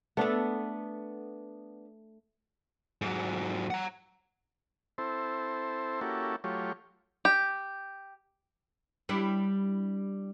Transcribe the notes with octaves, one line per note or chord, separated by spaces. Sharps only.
A3 B3 D4 A4
G#2 F#3
F#5 A#5
C4 E4 A4 C5
A#3 C#4 E4 F#4 G4 A4
F#3 A3 F4 G4 C#5
G4
G3 D4 E4